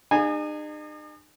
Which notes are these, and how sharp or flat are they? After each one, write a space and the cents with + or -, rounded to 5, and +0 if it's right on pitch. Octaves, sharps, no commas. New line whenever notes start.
D#4 -45 G#4 -35 G#5 -5